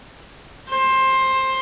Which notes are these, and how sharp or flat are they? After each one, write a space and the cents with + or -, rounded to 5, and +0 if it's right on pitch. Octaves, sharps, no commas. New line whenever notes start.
C5 +15